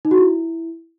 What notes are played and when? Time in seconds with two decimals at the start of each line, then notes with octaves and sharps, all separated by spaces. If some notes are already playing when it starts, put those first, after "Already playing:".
0.05 D#4
0.11 F#4
0.18 E4